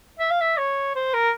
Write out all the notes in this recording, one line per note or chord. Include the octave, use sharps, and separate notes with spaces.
E5
F5
E5
C#5
C5
A#4